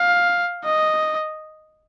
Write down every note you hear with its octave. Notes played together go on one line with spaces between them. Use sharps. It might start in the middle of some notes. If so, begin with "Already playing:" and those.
Already playing: F5
D#5